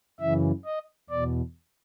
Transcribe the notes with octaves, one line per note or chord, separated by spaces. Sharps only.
F#2 C#3 E3 E5
D#5
E2 B2 D5